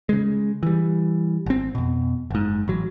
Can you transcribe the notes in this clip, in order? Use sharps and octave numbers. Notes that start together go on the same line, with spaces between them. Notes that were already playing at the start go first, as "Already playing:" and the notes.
C#3 G#3
E3 G3
G#1 C4
F2 B2
F#1 G#2
A1 F#3